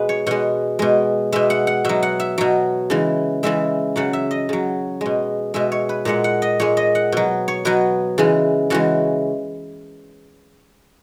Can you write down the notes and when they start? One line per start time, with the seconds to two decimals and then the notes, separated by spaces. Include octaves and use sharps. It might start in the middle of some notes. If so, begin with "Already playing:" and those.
Already playing: B2 G#3 B4
0.09 C#5
0.27 B2 G#3 F#5
0.79 B2 G#3
1.32 B2 G#3 E5
1.50 F#5
1.67 F#5
1.85 B2 F#3 E5
2.03 F#5
2.20 E5
2.38 B2 F#3
2.90 C#3 E3 G#3
3.43 C#3 E3 G#3 E5
3.96 C#3 F#3 F#5
4.13 E5
4.31 D#5
4.49 C#3 F#3
5.01 B2 G#3
5.54 B2 G#3 E5
5.72 C#5
5.89 B4
6.05 A#2 G#3 F#5
6.24 F#5
6.42 D#5
6.60 A#2 G#3 C#5
6.77 D#5
6.95 F#5
7.12 B2 F#3
7.48 C#5
7.65 B2 F#3 B4
8.18 C#3 E3 G#3
8.70 C#3 E3 G#3 F#4